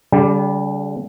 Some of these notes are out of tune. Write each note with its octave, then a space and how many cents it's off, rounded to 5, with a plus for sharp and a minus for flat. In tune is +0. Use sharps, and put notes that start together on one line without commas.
D3 -45 G3 +0 G4 +0